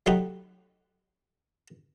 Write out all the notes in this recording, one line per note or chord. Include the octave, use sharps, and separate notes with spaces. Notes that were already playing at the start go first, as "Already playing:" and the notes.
F#3 A3 D#4 G4 F#5 B5